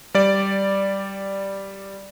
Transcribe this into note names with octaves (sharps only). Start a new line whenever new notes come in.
G3 D5